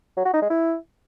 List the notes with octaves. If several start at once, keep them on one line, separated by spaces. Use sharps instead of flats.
F#3
F#4
D#4
G#3
E4